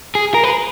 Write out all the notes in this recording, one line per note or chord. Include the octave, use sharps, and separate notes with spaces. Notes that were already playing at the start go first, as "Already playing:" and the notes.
G#4
A#4
B4